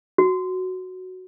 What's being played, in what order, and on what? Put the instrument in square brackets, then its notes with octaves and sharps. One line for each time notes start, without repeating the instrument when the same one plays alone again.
[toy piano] F#4